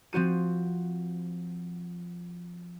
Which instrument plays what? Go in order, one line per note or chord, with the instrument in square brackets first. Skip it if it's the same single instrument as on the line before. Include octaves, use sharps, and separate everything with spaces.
[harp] F3 C4 F#4 D#7